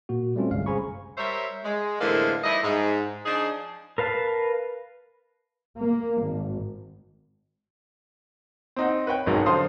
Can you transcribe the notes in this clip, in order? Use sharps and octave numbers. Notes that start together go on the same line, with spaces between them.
A#2 A#3 F#4
G3 A3 C4 C#4 F4
G1 C2 F#2 G#3 F5
G#4 C5 G#5 A#5 B5 C#6
G3 A#4 C5 C#5 E5
G#3
A2 D3 E3 F3 G#3 A#3
F3 G3 D#4 E4 D#5
G#2
F3 D4 D#4 G#4
A#4 B4 F5 A5
A#3
G#1
C4 D#4 F#5
B4 C#5 G5
F#1 B1 F2 G#2 F#3
D3 F3 C5 F5 C6 D#6